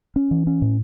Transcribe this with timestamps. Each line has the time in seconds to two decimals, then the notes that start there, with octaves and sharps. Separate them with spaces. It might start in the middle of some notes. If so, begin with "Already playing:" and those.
0.16 C#4
0.31 E3
0.47 C#4
0.62 A2